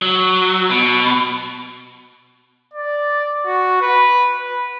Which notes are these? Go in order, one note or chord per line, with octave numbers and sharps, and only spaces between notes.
F#3
B2
D5
F#4
B4
B4